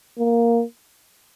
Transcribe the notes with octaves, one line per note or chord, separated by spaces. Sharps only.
A#3